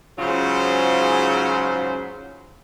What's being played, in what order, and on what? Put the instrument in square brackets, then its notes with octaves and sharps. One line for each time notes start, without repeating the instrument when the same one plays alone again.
[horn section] G#2 C#3 F#3 F4 C5